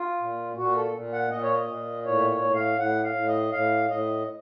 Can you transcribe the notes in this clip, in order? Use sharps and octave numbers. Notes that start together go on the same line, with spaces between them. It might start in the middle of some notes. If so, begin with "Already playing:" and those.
Already playing: F4
A#2
A#2 F#4
A4
A#2
F#5
A#2 D#5
C#5
D#5
A#2
A2 C#5
C#5
A2
F5
A2 F#5
F5
A2
D#5
A2 F5
A2 D#5